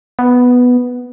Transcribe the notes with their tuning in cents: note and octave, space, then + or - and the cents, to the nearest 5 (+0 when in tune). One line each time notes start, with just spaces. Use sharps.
B3 +0